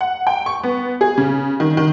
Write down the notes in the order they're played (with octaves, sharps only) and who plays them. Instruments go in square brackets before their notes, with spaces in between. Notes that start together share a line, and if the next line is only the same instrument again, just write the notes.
[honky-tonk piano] F#5
G5
C#6
B3
G#4
C#3
D#3
D#3